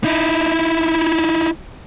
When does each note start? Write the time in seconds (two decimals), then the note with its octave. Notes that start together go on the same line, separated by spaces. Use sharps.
0.04 D#4 E4